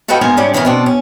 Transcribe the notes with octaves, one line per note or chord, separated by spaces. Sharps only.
F4 F#4 A4 B4 D#5 G5
G#2 A#3 B3 A#4 C5 G#5
G#2 C3 G3 C#4 D4
D#3 E3 B3 C#4 F#4 A#4
B2 C4 D4
C#4